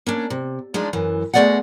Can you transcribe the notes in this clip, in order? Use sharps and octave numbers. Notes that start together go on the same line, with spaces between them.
A#3 C#4 D4
C3
F3 G#3 D4 D#4
F#2 E3
B2 G#3 A3 D5 D#5 F#5